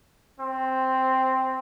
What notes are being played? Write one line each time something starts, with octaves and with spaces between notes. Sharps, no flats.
C4